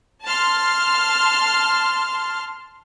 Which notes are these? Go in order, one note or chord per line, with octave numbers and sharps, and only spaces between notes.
A5 C6 F6